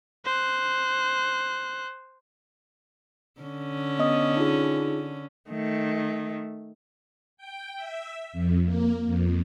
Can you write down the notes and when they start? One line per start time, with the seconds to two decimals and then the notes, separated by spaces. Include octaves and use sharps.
0.25 C5 F#6
3.41 D3 C#4
3.99 B3 D#5 D#6
4.37 D#4 F4 G#4
5.50 D#3 A3
7.37 G5
7.76 E5
8.33 F2
8.64 A#3
9.06 F2